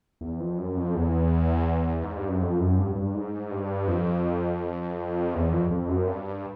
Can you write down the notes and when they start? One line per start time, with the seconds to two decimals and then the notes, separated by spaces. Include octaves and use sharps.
0.21 E2
0.40 F2
0.58 F#2
0.77 F2
0.95 E2
2.03 G#2
2.16 G2
2.28 F#2
2.42 F2
2.60 F#2
2.78 G2
2.96 G2
3.15 G#2
3.51 G2
3.88 F2
5.34 E2
5.52 F2
5.70 F2
5.89 F#2
6.08 G2